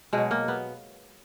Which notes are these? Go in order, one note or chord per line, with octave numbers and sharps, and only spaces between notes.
B2 F#3 G#3
A#3
B3